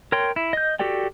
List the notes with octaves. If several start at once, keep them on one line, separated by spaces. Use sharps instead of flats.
A#4 C#5 G5 C6
E4
D#5 G6
F#4 G4 A4 D5 G5